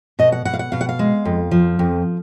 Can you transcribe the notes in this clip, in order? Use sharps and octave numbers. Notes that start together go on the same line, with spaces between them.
B2 D#5
F#5
B2 F#5
F5
F#5
B2 F5
F#5
F5
G#3
F2
F3
F2